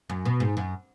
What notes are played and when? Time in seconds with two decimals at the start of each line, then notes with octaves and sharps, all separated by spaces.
0.10 F#2
0.25 B2
0.40 G#2
0.57 F#2